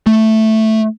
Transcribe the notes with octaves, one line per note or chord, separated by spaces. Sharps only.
A3